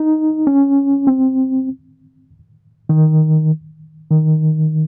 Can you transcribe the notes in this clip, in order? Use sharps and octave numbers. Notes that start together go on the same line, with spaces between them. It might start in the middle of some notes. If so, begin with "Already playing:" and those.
Already playing: D#4
C#4
C4
D#3
D#3